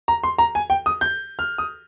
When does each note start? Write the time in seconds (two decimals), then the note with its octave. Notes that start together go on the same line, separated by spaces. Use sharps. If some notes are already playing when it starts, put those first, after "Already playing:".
0.08 A#5
0.24 C6
0.38 A#5
0.55 G#5
0.70 G5
0.86 D#6
1.01 G6
1.39 F6
1.58 D#6